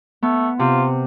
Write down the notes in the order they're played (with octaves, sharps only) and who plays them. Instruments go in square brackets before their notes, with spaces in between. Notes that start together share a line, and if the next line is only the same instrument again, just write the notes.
[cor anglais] A3 [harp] B3
[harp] C3 [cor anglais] F4